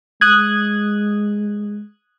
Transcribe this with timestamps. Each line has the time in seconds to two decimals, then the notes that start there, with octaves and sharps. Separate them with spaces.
0.21 G#3 D#6 F#6 G#6